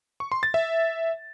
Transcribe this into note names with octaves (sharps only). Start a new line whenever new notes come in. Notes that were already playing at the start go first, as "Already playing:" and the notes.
C#6
C6
A6
E5